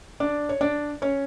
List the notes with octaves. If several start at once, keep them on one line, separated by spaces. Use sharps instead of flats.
D4 D5
C#5
D4 D5
C#4 C#5